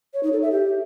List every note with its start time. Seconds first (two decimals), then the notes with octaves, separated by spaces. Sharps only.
0.14 C#5
0.23 D#4
0.33 A4
0.42 E5
0.51 G4